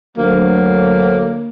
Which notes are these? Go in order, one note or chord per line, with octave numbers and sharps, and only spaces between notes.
D2 F#3 A#3